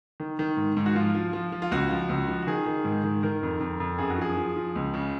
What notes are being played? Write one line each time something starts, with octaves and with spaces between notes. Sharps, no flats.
D#3
D#3
G#2
G#2
F#4
F3 F4
F3
F3
F3
F4
C#2 F#4
F3
C#2
F3
F#4
D#3 G#4
D#3
G#2
D#3
D#3 A#4
F2
F2
F2
F#2 G#4
F#4
F3 G#4
F3
F3
C#2
C#3